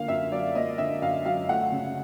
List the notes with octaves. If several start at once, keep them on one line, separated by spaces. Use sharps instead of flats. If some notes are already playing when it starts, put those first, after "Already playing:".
Already playing: D3 A#3 F5
F#2 E5
F#3 D5
A#3 D#5
D3 E5
F#2 F5
F#3 F5
A3 F#5
C#3